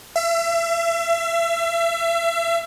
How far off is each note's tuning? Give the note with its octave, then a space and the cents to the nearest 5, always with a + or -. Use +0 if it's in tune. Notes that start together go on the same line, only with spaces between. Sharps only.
E5 +35